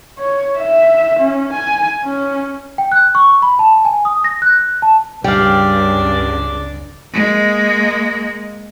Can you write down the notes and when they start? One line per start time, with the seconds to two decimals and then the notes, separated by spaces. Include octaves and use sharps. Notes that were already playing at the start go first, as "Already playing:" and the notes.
0.18 C#5
0.58 E5
1.20 C#4
1.53 G#5
2.04 C#4
2.78 G5
2.92 F#6
3.15 C#6
3.42 B5
3.59 A5
3.85 G#5
4.05 D#6
4.24 A#6
4.42 F#6
4.82 A5
5.24 C#2 G2 C#3 G3 D4 D5 F5 G5
7.13 G#3 A#3